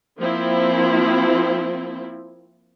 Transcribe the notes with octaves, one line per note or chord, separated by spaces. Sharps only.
F3 A#3 C4 E4